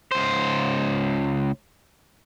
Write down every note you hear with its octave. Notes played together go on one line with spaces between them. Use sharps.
C#2 C5